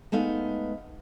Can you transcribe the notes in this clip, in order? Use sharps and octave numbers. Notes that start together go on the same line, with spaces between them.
G#3 A3 B3 D#4 F5